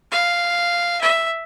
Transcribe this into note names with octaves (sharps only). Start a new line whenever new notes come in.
F5
E5